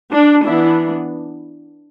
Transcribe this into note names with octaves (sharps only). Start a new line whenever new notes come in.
D4
E3 B3 D4 E4